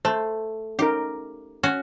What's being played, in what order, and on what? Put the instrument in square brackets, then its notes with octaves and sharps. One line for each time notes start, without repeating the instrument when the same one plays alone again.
[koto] A3 [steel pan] C5
[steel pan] C#4 D#4 A#4 [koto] G4
[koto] C#4 F#4